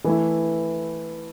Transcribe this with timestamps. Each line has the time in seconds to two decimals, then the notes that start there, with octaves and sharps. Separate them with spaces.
0.05 E3 A3 E4